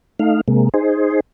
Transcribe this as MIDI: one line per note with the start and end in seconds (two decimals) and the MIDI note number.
0.20 0.41 57
0.20 0.41 63
0.20 0.41 77
0.48 0.69 48
0.48 0.69 56
0.48 0.69 58
0.74 1.20 63
0.74 1.20 68
0.74 1.20 72